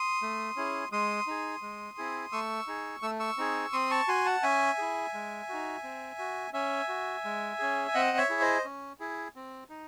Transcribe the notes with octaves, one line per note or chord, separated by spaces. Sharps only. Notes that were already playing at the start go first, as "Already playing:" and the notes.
Already playing: C6 D#6
A3
C#4 E4 G#4
G#3 C6 D#6
D#4 G#4
G#3
C4 E4 G#4
A3 C#6 E6
D#4 G#4
A3 E6
C#6 E6
C4 D#4 G#4
C4 C6 D#6
A5 C#6
F#4 G#5 C6
F#5 A5
C#4 E5 G#5
E4 G#4
G#3
D#4 F#4
C4
F#4
C#4 E5 G#5
F#4
G#3
C#4 G#4
G#5
C4 D#5 F#5
C#5 E5
E4 G#4
C5 D#5
C#4
E4 G#4
C4
D#4